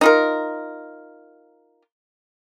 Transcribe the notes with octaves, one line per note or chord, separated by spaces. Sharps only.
D#4 F4 A#4